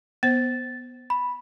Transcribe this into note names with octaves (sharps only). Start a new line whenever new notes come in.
B3 C5 A6
B5